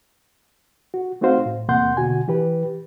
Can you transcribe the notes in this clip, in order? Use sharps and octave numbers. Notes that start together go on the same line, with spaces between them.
F#4
A3 C4 D#4 F#4 C5 F5
A2
E2 C3 A#3 F#5 C6 G6
B2 D3 F#4 G#5
E3 G4 B4